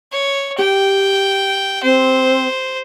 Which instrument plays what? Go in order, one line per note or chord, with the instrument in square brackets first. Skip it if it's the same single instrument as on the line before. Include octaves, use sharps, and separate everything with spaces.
[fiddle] C#5
[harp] G4 [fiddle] G5
[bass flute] C4 [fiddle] C5